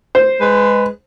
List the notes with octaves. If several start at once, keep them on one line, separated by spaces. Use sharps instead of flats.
C5
G#3 B4